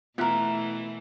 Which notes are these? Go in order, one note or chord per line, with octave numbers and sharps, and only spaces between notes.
B2 E3 A3 B3 F4 A#4 E5 F#6